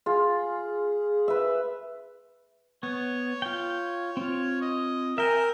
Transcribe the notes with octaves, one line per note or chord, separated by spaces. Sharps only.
F4 G#4
B4 E5
B3 C#5
F4 G5
C4 F4
D#5
A#4 E5 G5 G#5